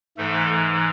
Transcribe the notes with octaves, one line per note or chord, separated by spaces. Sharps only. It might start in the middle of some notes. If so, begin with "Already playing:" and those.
G#2 E3 A3 A4